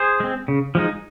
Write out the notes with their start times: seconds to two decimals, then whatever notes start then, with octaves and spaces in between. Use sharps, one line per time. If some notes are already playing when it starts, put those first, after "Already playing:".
Already playing: G#4 C5
0.20 G#3 C4
0.48 C#3
0.75 F3 G#3 D#4